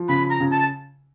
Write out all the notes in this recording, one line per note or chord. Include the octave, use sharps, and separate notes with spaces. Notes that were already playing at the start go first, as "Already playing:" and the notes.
Already playing: F3
C#3 B5
A#5
C#3
A5